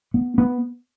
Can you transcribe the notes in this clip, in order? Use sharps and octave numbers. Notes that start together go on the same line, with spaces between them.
B3
B3